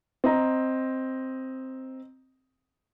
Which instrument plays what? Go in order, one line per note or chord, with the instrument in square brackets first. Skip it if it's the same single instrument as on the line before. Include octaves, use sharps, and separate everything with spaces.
[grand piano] C4 D#5 A#5